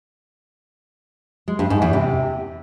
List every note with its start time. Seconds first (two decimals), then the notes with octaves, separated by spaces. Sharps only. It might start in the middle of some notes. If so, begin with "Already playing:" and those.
1.48 G#3
1.59 G2
1.70 G#2
1.82 E2
1.93 C3